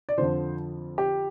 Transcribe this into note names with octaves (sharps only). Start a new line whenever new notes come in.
D5
F2 D3 F3 C5
G4